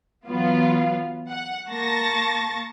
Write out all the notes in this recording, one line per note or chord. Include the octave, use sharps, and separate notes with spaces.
E3 F#3 B3 F4
F#5
A#3 A5 C#6 A6 A#6